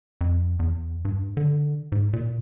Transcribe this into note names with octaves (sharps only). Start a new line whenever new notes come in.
F2
E2
G2
D3
G#2
A#2